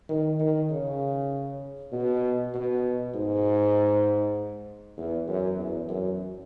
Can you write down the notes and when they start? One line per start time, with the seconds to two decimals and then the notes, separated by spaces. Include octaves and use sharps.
0.09 D#3
0.39 D#3
0.70 C#3
1.92 B2
2.54 B2
3.14 G#2
4.97 E2
5.28 F#2
5.59 E2
5.89 F#2